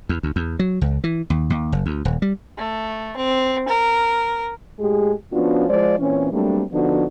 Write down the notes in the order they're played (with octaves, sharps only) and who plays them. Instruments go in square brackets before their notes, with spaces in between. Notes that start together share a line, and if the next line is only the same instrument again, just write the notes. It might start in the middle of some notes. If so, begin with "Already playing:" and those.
[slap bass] E2
D2
E2
F#3
C#2
E3
D#2
D#2
F#1
D2
D#1
G3
[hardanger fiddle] A3
C4
A#4
[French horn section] A2 G#3 G4 G#4
F3 B3 C#4 D4 F4 F#4
F3 G#3 F4 C5 D5
A#2 E3 C4 C#4
F#3 G3 A3 A#3 C4 D4
D3 F3 B3 D4 D#4 F#4